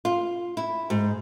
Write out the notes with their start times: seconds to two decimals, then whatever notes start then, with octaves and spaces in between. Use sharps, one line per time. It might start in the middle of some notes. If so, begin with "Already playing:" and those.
0.05 F4
0.57 E4
0.90 G#2